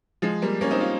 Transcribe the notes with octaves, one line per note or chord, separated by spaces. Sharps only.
F3 G#3
G3 A#3
A#3 C#4
C4 D#4
C#4 F4